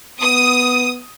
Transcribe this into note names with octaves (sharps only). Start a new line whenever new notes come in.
B3 D#6